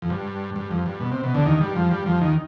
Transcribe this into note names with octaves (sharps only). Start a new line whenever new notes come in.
F2
G2
G2
F2
G2
B2
C3
B2
D2 D3
D#2 D#3
G2 G3
F2 F3
G2 G3
F2 F3
D#2 D#3